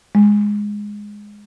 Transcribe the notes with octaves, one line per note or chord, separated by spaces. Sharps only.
G#3